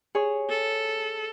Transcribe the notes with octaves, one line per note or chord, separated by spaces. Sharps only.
G#4 C#5
A4